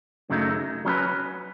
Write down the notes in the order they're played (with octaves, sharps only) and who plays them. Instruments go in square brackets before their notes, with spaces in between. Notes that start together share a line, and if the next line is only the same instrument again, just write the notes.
[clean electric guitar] F#2 C#3 F#3 A3 D#4
F#3 C#4 G#4 B4